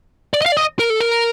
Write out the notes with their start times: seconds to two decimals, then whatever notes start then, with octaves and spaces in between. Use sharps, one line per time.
0.34 D5
0.42 D#5
0.46 F5
0.52 D5
0.57 D#5
0.79 A#4
0.90 A4
1.01 A#4